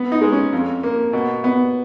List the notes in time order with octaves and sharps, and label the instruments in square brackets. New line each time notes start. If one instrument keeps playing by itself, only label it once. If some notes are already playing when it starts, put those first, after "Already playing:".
Already playing: [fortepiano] B3
D#4
G#3
C#4
F2
A#3
B2
B3